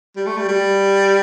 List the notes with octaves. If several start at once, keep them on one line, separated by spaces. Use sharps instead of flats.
G3
A3
G3
G3